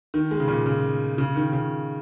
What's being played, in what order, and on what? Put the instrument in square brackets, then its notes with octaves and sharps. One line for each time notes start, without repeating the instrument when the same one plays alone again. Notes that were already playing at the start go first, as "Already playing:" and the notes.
[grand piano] D#3
G#3
C#3
A#2
C#3
C#3
D#3
C#3